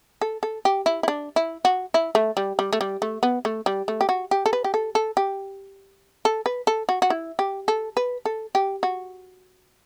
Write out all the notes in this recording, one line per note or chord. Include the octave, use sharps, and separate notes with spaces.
A4
A4
G4
E4
E4
D4
E4
F#4
E4
A3
G3
G3
A3
G3
A3
B3
A3
G3
A3
G4
F#4
G4
A4
B4
G4
A4
A4
G4
A4
B4
A4
F#4
F#4
E4
G4
A4
B4
A4
G4
F#4